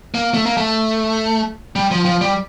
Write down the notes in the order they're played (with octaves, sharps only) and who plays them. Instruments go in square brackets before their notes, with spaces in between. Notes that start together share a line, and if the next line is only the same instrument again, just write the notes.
[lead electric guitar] A#3
A3
A#3
A3
G3
F3
F3
G3